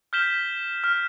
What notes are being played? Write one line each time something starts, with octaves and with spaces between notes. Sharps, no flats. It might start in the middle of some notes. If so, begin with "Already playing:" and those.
F6 G6 B6 E7 G7
F6